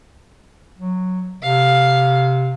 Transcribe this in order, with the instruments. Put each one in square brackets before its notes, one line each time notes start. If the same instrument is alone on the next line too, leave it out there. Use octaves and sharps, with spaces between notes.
[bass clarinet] F#3
[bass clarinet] C3 [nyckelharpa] F5